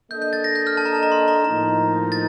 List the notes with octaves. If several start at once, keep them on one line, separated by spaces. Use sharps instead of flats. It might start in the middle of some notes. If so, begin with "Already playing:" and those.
A#3 D4 A4 D#5 G6
G6
A6
A#6
G6
F6
A5
A#5
A5
A#5
C6
A#5
A2 F3 A#3 D#4 A#5
A6